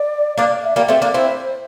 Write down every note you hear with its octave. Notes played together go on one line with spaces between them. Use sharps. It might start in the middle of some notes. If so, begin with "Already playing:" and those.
Already playing: D5
A#3 D4 D5
E5
G3 A#3 D5
A3 C4
A#3 D4 A#4
C4 E4 C5